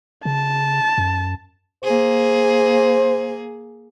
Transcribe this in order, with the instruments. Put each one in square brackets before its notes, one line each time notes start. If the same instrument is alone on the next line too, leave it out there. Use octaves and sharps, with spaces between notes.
[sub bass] C#3 [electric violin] A5
[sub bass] F#2
[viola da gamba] A#3 G#4 [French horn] C5